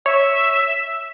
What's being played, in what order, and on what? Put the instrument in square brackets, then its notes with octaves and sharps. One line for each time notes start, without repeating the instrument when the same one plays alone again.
[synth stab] C#5 [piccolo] E5